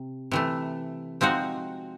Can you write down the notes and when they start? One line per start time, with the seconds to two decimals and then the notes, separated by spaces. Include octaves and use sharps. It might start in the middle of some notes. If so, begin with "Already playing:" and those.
Already playing: C3
0.31 C3 E3 A3
1.21 F3 G#3 C4 D#4 F#4